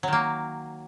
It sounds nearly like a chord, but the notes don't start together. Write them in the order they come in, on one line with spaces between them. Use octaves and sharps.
F#3 D#3 A#3